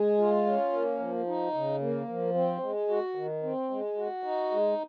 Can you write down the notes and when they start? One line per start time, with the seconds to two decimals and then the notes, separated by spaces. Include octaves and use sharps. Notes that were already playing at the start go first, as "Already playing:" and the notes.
Already playing: G#3 G#4
0.18 F4
0.46 C#4
0.73 A#3
0.99 F3
1.27 D#4
1.54 C#3
1.81 A#3
2.08 F3
2.34 C4
2.62 G#3
2.89 F#4
3.15 D#3
3.43 C4
3.70 G#3
3.97 F#4
4.24 D#4
4.51 G#3